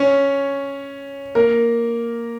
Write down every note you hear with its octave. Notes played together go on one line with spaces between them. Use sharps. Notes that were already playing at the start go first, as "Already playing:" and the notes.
Already playing: C#4 C#5
A#3 A#4